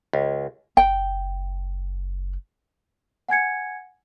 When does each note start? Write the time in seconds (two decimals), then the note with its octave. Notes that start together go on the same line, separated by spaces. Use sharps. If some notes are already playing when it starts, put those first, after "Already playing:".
0.13 C#2
0.77 F#1 G5
3.29 F#5 G#5 G#6 C#7